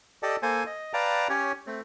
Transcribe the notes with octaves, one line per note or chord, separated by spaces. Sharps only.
G4 A4 D5 D#5 A5
A#3 A4 C5 G#5
D#5
B4 D5 F5 G5 A5 A#5
C#4 G4 C#5
A3 C4